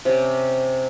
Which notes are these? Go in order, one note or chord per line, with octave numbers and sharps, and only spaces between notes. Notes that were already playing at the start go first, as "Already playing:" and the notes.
C3 C#4 G4